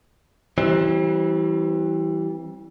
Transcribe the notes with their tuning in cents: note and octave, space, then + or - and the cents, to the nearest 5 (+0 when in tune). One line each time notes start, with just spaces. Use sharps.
E3 -10 G3 -30 C4 +30